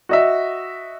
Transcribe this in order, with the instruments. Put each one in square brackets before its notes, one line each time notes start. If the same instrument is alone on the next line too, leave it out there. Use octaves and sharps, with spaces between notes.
[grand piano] F#4 D#5 E5